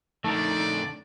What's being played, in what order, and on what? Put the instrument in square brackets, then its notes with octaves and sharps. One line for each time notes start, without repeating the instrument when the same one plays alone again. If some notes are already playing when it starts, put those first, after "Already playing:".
[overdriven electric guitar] F2 D3 [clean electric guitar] A3 A4 A#4 [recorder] D#4 [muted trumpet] D5